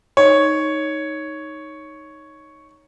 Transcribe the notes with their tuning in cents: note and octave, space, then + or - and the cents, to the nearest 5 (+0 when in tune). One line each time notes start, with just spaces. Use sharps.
D#4 +0 C#5 +0